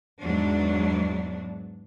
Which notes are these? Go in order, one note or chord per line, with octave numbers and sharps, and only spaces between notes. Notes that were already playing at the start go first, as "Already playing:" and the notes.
E2 G#2 F#3 D4